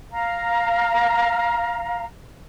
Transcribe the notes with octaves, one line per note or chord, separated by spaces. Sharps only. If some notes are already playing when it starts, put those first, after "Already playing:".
F5 A#5